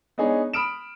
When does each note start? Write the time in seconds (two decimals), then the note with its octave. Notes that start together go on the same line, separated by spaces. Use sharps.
0.18 B3 D4 D#4 G#4 C#5
0.53 B5 D#6 F6 D7 E7